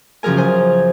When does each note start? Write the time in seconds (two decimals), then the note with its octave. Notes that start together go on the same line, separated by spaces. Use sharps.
0.23 F#2 C#3 F3 G#4 A#4 G#5
0.37 C5 G#5